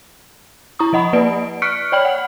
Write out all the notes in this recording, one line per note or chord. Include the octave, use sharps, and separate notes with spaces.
E4 A#5 C#6 D#6
F3 D#5 F#5 B5
A#3 B4 D5 D7
C#6 F6 F#6 B6 C#7 D7
C#5 D5 G5 B5 F6 F#7
F#5